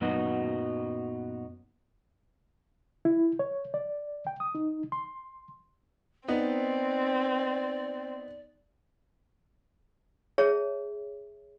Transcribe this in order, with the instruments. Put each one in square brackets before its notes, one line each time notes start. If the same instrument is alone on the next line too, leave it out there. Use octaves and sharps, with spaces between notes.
[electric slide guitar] F#2 A#2 F#3 B3 D#4 F#4
[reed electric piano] E4
C#5
D5
G5
D#6
D#4
C6
[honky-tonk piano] B3 D#4 [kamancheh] C4 [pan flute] D5
[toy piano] G#4 C#5 E5 A5